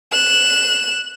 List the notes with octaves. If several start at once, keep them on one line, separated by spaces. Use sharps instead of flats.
F#6 E7